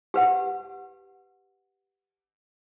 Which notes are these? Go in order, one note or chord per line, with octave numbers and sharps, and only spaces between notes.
G4 B4 F#5